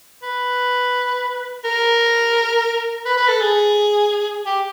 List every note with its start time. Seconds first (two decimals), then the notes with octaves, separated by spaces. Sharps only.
0.23 B4
1.65 A#4
3.05 B4
3.18 B4
3.29 A4
3.41 G#4
4.46 G4